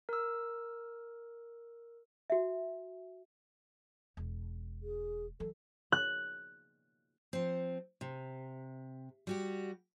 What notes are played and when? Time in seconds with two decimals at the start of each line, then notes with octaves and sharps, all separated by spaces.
0.09 A#4 E6
2.30 F#4 E5
4.17 E1
4.83 G#4
5.40 E3 F#3 A4
5.92 F#6
7.33 F3 C4
8.01 C3
9.27 G3 F#4 G4